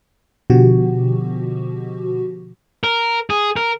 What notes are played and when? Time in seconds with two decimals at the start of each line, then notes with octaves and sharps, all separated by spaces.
0.50 B2 D3 F3 F#4 G4
2.84 A#4
3.30 G#4
3.57 A#4